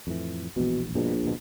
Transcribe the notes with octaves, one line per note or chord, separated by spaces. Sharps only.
F2 A2 E3
E1 A#1 E2 B2
A#1 G2 B2
D1 B2